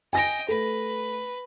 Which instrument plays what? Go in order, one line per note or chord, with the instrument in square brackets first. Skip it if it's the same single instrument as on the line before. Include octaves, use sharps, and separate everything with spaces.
[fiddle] D#5 G5 [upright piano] G#5 A#6
[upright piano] A3 [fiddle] B4